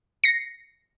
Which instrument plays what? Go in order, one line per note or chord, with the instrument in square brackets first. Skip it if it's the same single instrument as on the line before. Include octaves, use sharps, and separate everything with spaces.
[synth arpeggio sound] A#6 C7 C#7